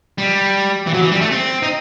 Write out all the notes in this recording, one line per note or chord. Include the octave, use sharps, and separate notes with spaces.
G3
E3
F#3
E3
G3
A3
C4
D#4